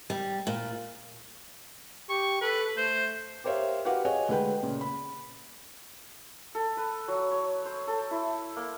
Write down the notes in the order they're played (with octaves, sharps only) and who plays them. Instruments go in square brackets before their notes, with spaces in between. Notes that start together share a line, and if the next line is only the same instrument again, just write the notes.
[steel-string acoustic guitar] G3
A#2
[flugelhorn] G4 [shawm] C#6
[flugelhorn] A4 [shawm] B4
[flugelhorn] A3 [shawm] C5
[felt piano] G4 A#4 C5 C#5 E5 F5
F#4 G4 B4 F5 F#5
G#4 C#5 D#5 F#5 G#5
D2 G#3 B4 G5
A#2 C#3
B5
[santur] A4
B4
F#3
C#5
C5
A4
E4
A#3